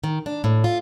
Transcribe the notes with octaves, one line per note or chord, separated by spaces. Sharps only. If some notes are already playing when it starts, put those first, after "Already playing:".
D#3
D4
A2
F4